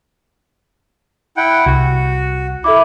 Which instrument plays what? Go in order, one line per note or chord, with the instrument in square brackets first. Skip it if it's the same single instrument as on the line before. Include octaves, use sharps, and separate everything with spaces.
[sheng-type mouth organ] E4 F#5 G5
[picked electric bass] C2 [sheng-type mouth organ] F#4
[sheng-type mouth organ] E4 [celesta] A4 E5 D6